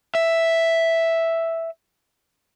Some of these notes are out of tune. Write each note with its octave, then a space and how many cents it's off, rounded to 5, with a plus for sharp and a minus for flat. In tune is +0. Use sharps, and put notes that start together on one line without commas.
E5 +0